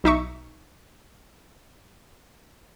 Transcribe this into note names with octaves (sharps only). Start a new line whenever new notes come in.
B1 D#4 E5 C#6